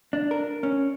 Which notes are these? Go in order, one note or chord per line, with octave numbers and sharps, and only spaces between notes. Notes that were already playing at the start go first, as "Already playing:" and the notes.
D4
A#4
C#4